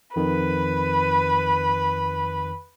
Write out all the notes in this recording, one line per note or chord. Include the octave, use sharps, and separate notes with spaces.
F2 D#3 B4